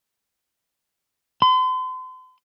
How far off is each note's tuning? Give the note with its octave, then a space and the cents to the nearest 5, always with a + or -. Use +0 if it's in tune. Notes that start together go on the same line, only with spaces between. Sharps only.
C6 -40